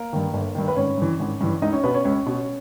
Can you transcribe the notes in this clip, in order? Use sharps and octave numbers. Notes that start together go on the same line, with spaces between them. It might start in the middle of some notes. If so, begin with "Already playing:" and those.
Already playing: A#3 A#4
G2 D#3
G1
G2 D#3
B4
G#1 C#4 C#5
G2 E3
G#1
G2 E3
C#2 D#4 D#5
C#4 C#5
B2 B3 B4
C#4 C#5
C#2 C#4 C#5
B2